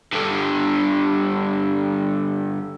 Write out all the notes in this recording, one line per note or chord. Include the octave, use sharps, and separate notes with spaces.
G2 D3